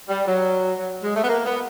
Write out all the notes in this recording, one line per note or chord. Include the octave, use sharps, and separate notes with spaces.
G3
F#3
F#3
G#3
A3
B3
A#3
B3